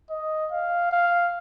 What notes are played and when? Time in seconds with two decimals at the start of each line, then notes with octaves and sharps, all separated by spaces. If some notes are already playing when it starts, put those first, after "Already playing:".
0.10 D#5
0.51 F5
0.92 F5